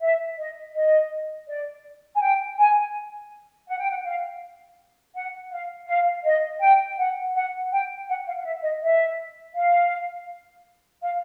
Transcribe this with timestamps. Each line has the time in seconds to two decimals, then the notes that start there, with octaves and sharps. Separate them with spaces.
0.02 E5
0.38 D#5
0.75 D#5
1.48 D5
2.15 G#5
2.21 G5
2.58 G#5
3.68 F#5
3.79 G5
3.90 F#5
4.05 F5
5.14 F#5
5.51 F5
5.88 F5
6.25 D#5
6.61 G5
6.98 F#5
7.35 F#5
7.72 G5
8.08 F#5
8.27 F5
8.39 F5
8.45 E5
8.63 D#5
8.82 E5
9.55 F5
11.02 F5